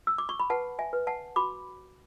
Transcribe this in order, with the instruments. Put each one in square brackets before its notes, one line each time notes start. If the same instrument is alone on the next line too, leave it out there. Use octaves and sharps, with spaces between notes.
[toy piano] E6
D6
C#6
B5
B4 F#5 A5
E5 G#5
B4
F#5 A5
F#4 B5 D6